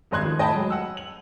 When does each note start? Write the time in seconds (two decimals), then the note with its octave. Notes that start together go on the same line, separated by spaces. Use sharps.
0.11 D#1 G#1 D#5 C6 F#6 G#6
0.23 D#3 F3
0.38 A2 D#5 G5 A5 B5
0.54 F#3 G#3
0.70 F#5 E6
0.97 F#7